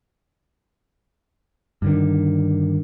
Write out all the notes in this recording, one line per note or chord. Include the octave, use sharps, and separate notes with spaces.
G2 D3 D#3